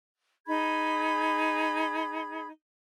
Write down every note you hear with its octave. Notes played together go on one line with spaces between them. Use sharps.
D#4 G#4 B5 G#6